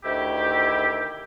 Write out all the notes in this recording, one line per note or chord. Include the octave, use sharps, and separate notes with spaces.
D2 D#3 E4 G4